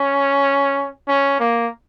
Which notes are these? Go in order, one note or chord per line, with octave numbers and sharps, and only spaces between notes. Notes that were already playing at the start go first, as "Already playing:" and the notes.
Already playing: C#4
C#4
A#3